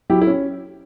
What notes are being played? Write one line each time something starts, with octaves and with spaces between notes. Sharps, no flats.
F#3 E4 G4
E4
C#4